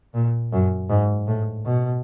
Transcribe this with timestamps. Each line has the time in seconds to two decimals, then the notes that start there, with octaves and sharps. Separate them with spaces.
0.14 A#2
0.52 F#2
0.89 G#2
1.27 A2
1.65 B2